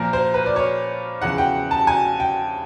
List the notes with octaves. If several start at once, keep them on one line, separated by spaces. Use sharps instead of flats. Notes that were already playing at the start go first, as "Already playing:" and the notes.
Already playing: A#2 F3 A#4
C5
B4
D5
C#5
E2 C#3 F3 F#5
G5
A5
G#5
G5